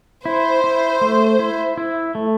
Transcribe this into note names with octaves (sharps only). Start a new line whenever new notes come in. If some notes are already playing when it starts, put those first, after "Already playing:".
E4 C5
E4
A3
E4
E4
A3